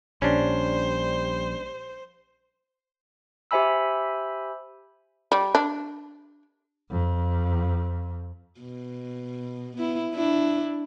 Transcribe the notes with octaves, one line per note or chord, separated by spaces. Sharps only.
A#1 G3 C#4 D4 C5
G4 C5 E5 G#5 B5 E6
G3
D4
F2
B2
B3 E4
D4 E4